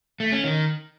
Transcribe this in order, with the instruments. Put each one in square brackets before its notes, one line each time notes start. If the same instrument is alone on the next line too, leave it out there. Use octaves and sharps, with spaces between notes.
[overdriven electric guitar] A3
C#4
D#3